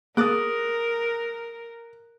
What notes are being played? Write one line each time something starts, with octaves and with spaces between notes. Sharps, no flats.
A#3 G#4 A#4 D6 D#6 F#6 A6